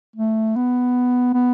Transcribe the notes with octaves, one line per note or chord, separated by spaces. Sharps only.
A3
B3
B3